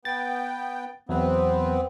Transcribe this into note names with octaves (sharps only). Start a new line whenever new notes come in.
B3 G5 A6
E2 F#3 B3 C4 B4